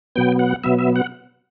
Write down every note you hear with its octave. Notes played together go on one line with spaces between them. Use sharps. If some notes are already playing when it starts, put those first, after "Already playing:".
B2 F#3 B3 G5
F#5
B2 F#3 B3 E5
E5
F#5